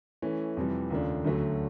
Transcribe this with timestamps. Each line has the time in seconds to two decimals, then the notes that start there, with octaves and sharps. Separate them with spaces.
0.22 E3 A3 C#4
0.57 F2 C3 E3 G3
0.90 D#2 C#3 F3 A3 D4
1.24 D2 D3 F#3 A3 C#4